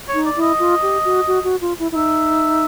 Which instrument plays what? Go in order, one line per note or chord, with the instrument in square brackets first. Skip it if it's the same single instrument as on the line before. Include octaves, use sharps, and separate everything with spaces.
[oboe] C#5
[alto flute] D#4
[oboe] D5
[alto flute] E4
[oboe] D#5
[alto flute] F4
G4
F#4
F#4
F#4
F4
E4
E4
[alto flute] D#4 [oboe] E5